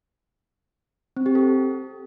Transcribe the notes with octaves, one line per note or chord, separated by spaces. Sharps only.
C4
G4
A4